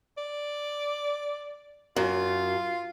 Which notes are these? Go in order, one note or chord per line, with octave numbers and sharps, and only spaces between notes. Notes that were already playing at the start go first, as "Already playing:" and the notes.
D5
F#2 F4